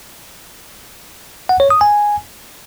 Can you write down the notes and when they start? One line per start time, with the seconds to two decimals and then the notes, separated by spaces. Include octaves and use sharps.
1.49 F#5
1.60 C#5
1.70 D#6
1.81 G#5